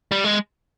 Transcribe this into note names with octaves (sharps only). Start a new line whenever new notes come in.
G3
G#3